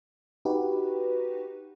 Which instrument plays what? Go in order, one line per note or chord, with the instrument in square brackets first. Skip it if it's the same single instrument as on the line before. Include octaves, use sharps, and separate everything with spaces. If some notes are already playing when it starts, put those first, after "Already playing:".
[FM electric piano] D#4 F#4 G4 B4